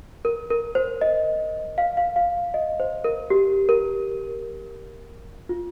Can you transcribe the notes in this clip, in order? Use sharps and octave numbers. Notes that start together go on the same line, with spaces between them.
A#4
A#4
C5
D#5
F5
F5
F5
D#5
C5
A#4
G4
A#4
F4